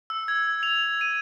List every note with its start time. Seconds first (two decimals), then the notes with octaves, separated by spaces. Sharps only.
0.10 E6
0.28 G#6
0.63 F7
1.01 D#7